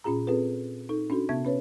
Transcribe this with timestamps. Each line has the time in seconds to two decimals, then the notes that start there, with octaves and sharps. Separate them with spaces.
0.04 A#2 C#4 F4 G#4 A#5
0.27 C4 F4 G#4 A4 B4
0.89 D#4 A4
1.10 C#4 D4 F#4 A4
1.29 C3 B3 E5 G#6
1.45 C#4 B4 C#5